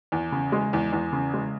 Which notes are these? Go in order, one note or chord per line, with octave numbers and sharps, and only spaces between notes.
E2
C#3
G#3
E2
E2
C#3
G#3